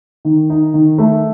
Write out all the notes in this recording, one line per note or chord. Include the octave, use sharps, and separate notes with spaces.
D#3
D#4
D#3
A3